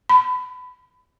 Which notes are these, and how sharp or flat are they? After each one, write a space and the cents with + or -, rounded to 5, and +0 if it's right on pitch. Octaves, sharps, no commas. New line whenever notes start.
B5 +25